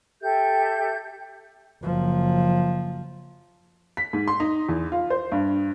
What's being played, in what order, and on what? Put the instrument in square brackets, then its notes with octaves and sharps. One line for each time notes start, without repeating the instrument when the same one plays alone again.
[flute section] G4 A4 E5 G6
[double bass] F#1 F3
[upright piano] B6
G#2
C6
D#4
E2
F4
C5
G2